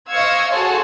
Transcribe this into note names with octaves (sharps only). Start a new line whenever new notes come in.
C5 D#5 F5 C#6 E6 G#6
F#4 G#4 A4 C#5 A5 C6